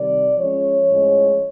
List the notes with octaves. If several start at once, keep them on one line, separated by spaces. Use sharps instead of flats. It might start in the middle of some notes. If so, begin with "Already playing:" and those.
Already playing: C3 D#3 G3 D5
F3 G#3 C#4 C#5
A2 F3 G#3 C#4